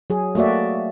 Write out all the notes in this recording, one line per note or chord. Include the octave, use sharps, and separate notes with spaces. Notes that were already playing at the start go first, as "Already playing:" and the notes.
F#3 G#4
A3 A#3 F#4 D5 E5